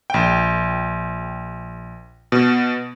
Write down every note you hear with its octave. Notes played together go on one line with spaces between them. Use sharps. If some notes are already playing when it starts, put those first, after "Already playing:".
A#1 G5
B2